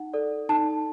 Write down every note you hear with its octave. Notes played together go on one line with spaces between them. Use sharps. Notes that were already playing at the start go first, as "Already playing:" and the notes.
Already playing: D#4 F#5
A4 D5
D#4 A5